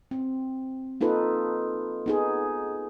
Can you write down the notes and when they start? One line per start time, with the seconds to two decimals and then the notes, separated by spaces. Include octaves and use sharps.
0.11 C4
1.01 A#3 D#4 F4 A4 B4
2.06 B3 D#4 G#4